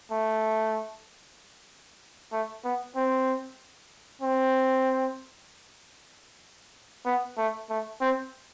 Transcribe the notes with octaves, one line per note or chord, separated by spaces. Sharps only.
A3
A3
B3
C4
C4
B3
A3
A3
C4